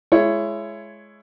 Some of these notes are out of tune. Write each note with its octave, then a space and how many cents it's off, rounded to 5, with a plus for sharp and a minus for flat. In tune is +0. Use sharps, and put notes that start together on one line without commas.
G#3 +20 E4 +25 C#5 +0